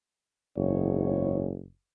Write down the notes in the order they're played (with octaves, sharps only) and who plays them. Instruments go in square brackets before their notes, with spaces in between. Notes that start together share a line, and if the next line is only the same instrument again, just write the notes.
[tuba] F#1 [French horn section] E2 G#2 C#5